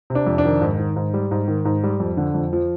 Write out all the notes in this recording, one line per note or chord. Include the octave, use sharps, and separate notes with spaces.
C3
D4
F2
D4
D#3
G#2
D#3
G#2
G3
G#2
D#3
G#2
G3
F2
D3
F2
F3